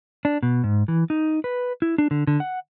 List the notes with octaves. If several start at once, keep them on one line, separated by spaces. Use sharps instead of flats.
D4
B2
G#2
E3
D#4
B4
E4
D4
D3
D3
F#5